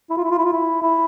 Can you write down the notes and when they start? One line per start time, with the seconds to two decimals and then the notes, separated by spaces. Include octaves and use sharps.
0.10 E4
0.17 F4
0.24 E4
0.31 F4
0.38 E4
0.45 F4
0.53 E4
0.82 E4